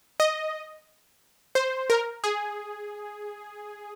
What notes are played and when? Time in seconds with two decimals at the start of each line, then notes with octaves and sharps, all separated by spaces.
0.20 D#5
1.55 C5
1.90 A#4
2.24 G#4